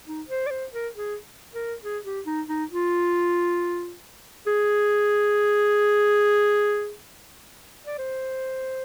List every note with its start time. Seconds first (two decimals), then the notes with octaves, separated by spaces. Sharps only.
0.07 D#4
0.28 C5
0.47 D5
0.51 C5
0.73 A#4
0.95 G#4
1.54 A#4
1.83 G#4
2.05 G4
2.26 D#4
2.49 D#4
2.71 F4
4.47 G#4
7.86 D5
7.99 C5